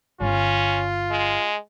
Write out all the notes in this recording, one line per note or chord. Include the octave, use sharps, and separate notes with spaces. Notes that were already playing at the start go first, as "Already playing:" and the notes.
G1 C#4 F4
G#3